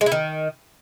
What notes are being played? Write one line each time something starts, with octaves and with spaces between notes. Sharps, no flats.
G#3
E4
D#3